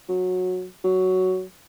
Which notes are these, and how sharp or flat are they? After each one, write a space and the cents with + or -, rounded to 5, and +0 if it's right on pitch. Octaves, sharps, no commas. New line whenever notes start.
F#3 -15
F#3 +5